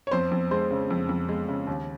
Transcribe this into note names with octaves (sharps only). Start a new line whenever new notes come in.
C#5
F2 C5
F2
G#3 C5
C#3
F2
F2
G#3
C#3
D#2